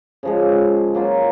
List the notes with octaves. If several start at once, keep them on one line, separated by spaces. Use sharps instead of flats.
C#3 F3 G#3
F#3 A#3 F4 A#4